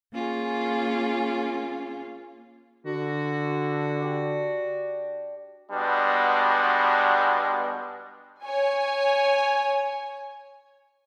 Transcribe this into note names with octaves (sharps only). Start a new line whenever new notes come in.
A#3 C#4 F4 G#4
D3 F#4
D4 G4 D5
B2 G3 G#3 B3 D4
C#5 G#5